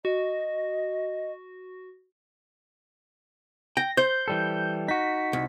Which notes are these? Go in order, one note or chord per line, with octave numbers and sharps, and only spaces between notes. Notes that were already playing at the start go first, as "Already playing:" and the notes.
F#4 D#5
G5 A#6
C5 G6
E3 G3 A4
D#4 F#4 B6
C2